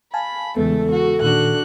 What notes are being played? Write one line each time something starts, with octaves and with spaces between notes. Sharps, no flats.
F5 G#5 A5 B5
E2 C#3 G#3 A3 B3 A4
F#4
A#2 D#3 D4 F#4 F#6